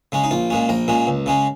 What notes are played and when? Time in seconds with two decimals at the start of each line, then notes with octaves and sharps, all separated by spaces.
0.12 C#3 G#3 C#4
0.24 D#4
0.31 A#1 F4
0.50 A#2 G#3 C#4
0.69 A#1 A#4
0.88 A#2 G#3 C#4
1.07 C#2
1.26 C#3 G#3 C#4